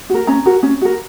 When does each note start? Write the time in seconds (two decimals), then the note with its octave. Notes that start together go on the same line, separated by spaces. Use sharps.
0.10 F#4 A#4
0.27 C#4 A#5
0.46 F#4 A#4
0.63 C#4
0.81 F#4 A#4